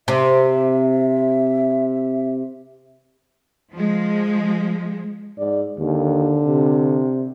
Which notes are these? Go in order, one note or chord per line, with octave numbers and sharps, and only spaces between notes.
C3 E5
F3 G#3
G#2 D5
D#2 D3
C3